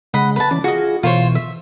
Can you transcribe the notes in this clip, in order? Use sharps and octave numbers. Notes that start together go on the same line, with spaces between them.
C#3 G#3 D#5 F#5 B5
B4 A5
E3 C#4 D5
F4 F#4 G#4 D#5
B2 E3 F4 C5 C#5
E5